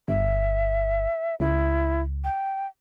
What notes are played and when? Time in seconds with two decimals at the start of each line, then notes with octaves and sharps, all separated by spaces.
0.08 G1 E5
1.40 C#2 E4
2.24 G5